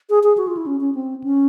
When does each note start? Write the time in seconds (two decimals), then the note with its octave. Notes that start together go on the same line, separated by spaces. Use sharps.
0.10 G#4
0.23 G#4
0.38 F#4
0.47 F4
0.57 E4
0.66 C#4
0.80 C#4
0.95 C4
1.24 C#4